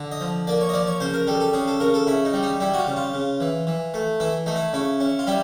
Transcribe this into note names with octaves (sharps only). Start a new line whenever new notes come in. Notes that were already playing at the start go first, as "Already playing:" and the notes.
Already playing: D3
D#5
F3
A#3 D5
C#5
D#5
F3 D5
C#5
C#3 C5
A#4
G3 A4
A4
C#3 G#4
A4
C#3 A#4
A4
C#3 E4
D#4
G3
D#4
G3 E4
F#4
F4
C#3
F4
C#3
E3
E3
A3
E3 E4
A3 D#4
E4
C#3 E4
C#4
F4
G3 E4